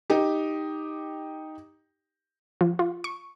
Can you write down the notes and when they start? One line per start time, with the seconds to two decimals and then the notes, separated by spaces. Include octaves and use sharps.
0.10 D#4 G4
2.61 F3
2.79 F4
3.04 C#6